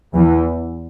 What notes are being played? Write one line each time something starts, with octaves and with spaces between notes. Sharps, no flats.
E2 E3